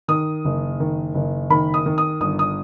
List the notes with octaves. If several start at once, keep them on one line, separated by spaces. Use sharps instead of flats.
D#3 D#6
F#1
D#3
F#1
D#3 B5
D#6
D#3
D#6
G1 D#6
D#6